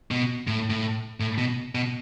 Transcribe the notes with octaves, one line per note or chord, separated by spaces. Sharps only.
B2
A2
A2
A2
B2
B2